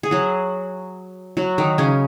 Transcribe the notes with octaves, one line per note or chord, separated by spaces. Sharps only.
G#4
F#3 F#4
F#3 F#4
D#3 D#4
C#3 C#4